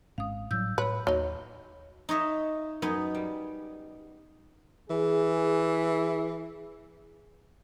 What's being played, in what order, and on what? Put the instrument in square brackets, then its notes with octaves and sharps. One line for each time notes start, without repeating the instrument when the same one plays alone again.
[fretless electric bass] G#1 G#2 C#4 [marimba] F5 D#6
[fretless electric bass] A2 F#3 G3 [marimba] E6 G6
[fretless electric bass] A2 [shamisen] B4 [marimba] C#5 B5
[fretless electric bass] D#2 [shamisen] F#3 D#4
[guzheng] D#4 C#5 D#5 E5
F#2 B3 D#4 G#5
G3
[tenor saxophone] E3 [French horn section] G#4